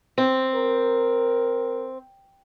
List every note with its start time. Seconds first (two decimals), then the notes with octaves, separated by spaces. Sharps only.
0.18 C4
0.55 A#4